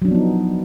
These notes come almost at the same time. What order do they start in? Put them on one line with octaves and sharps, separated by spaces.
F#3 D4 F3 B3 D#4